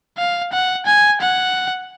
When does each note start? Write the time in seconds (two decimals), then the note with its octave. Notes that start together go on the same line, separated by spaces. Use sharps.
0.18 F5
0.52 F#5
0.86 G#5
1.21 F#5